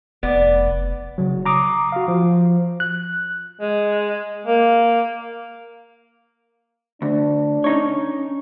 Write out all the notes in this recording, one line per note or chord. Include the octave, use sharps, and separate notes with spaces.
F1 B3 D5
C#3 F#3
A#5 D6 D#6
F#4 F5
F3
F#6
G#3
A#3
D2 D4
C#4 D#4 C#5